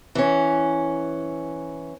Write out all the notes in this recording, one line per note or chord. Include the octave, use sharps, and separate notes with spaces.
E3 C#4